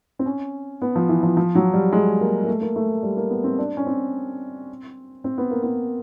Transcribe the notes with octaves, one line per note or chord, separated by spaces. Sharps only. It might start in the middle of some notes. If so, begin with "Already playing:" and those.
C4
C#4
B3
F3
E3
F3
F3
F#3
G3
G#3
A#3
A#3
A3
A#3
A3
G3
A#3
B3
C4
D4
C#4
C4
C4
B3
A#3
B3